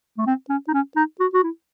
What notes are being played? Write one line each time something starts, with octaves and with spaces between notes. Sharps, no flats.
A3
C4
C#4
D#4
C#4
D#4
F#4
F#4
E4